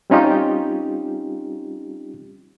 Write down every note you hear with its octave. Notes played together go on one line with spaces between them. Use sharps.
G3 C4 C#4 D#4 F4 G4